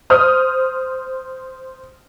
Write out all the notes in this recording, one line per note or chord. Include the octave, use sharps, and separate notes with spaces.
C5 D#6 F6 G6